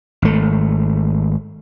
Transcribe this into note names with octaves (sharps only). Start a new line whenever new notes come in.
G#1 A3